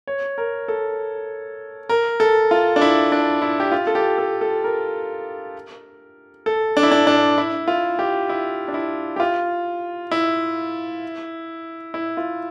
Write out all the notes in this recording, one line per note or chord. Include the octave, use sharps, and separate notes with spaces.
C#5
A#4
A4
A#4
A4
F4
D4
E4
D4
E4
G4
F4
A4
G4
A4
A4
A#4
A4
D4
E4
D4
D4
E4
F4
G4
E4
D4
E4
G4
F4
E4
E4
F4